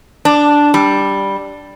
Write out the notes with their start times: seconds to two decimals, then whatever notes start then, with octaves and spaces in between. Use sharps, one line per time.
0.25 D4
0.74 G3